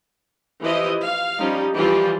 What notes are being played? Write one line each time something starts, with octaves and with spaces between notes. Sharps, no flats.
E3 F3 E4 G4 D#5
F5
F3 G3 C#4 D#4
E3 F3 G3 F4 G4